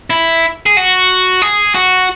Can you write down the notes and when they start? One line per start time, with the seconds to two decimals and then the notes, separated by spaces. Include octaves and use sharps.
0.10 E4
0.66 G#4
0.77 F#4
1.42 G#4
1.75 F#4